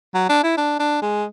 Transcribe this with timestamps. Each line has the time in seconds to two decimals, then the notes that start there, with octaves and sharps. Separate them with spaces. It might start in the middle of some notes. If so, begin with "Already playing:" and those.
0.15 F#3
0.29 D4
0.44 E4
0.58 D4
0.80 D4
1.02 G#3